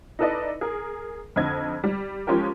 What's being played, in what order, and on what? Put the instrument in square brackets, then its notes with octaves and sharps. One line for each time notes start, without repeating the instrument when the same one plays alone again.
[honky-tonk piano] D#4 E4 A4 B4 D5 D#5
G#4 A#4
F2 D3 C4 D#5 G#6
G3
F3 G#3 C#4 F4 G4 A#4